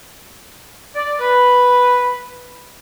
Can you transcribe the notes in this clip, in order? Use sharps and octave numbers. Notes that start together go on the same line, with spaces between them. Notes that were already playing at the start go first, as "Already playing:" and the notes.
D5
B4